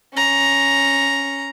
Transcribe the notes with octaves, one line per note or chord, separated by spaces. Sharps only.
C#4 A#5